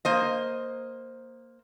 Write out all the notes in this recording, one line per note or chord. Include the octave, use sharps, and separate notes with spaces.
A#3 C5 D#5